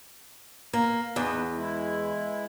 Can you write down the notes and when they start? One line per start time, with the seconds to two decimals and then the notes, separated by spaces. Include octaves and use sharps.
0.73 A#3
1.16 E2 B3 D#4 B4
1.55 G#3 E4